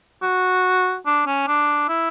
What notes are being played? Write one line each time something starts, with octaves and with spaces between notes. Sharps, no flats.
F#4
D4
C#4
D4
E4